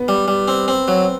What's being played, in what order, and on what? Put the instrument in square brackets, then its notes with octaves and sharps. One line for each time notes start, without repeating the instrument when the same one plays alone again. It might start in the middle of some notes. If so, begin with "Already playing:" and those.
Already playing: [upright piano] B3
[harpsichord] G3
G3
C4
C4
F#3